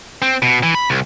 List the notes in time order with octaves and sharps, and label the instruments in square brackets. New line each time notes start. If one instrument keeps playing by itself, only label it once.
[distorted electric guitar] C4
B2
E3
B5
C2